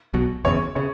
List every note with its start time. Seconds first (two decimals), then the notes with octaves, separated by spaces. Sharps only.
0.14 B1 B2 F#3
0.44 F#1 E2 C#3 C#5
0.75 C#3 C#5